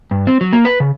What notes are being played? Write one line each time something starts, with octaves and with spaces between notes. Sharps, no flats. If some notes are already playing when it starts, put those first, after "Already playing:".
G2
C4
F#3
A#3
B4
C#3